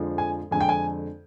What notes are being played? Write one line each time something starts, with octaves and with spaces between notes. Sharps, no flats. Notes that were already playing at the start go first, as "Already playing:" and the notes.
Already playing: F2 D3 F3 G#3
G#5
F2 D3 G#3 G#5
G5
G#5